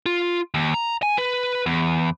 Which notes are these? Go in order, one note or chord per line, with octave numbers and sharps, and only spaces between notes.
F4
D#2
A#5
G#5
B4
E2